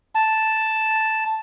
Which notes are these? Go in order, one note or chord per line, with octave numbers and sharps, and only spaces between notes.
A5